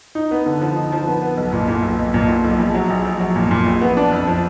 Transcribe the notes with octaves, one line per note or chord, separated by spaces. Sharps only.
D#4
B3
D3
F3
D#4
F3
B3
B3
B1
A#2
A#2
B1
B1
A#2
A#2
B1
A#1
F#3
A#1
A#1
F#3
A#2
A#2
A#1
B3
D4
F2
F3